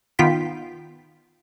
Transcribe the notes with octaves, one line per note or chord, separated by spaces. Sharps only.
D#3 B3 F4 G5 B6